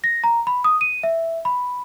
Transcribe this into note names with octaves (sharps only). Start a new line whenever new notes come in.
A#6
A#5
B5
D#6
D#7
E5
B5